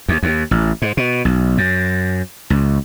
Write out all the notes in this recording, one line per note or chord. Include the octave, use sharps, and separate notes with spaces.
D#2
D#2
A1
G#2
B2
B1
F#2
C#2